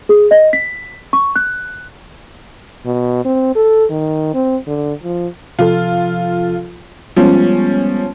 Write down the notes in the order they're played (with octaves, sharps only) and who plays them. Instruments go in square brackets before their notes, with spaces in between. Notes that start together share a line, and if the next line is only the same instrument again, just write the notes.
[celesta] G#4
D#5
B6
C#6
F#6
[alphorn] B2
C4
A4
D#3
C4
D3
F3
[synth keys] C3 F3 A4 [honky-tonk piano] F4
[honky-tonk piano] F3 C#4 [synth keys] G3 G#3 B3